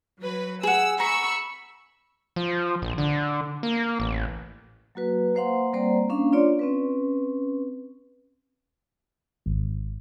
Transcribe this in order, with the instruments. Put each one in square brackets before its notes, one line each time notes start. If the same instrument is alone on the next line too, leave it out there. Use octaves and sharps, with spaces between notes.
[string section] F#3 B4
[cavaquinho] G#4 F#5 [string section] E6
[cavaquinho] A#5 [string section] B5 C#6 E6
[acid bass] F3
A#1
D3
A#3
A1
[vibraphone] F#3 A#3 F#4 B4
A#3 C5 F5 F#5 C6
G3 A#3 C4 C5 D5 A#5
A#3 C#4 D4 F5
D4 F4 C#5 D5 C6
C4 C#4 B4
[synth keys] G#1